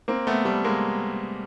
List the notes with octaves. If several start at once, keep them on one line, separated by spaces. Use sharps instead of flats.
A#3 C4
A3 B3
G3 A3
G#3 A#3